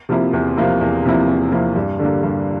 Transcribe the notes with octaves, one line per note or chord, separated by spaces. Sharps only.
C3 F3 A#3 E4
E2
C3 F3 A#3 E4
E2
C3 F3 A#3 E4
E2
C3 F3 A#3 E4
G2
D3 G3 A#3
G2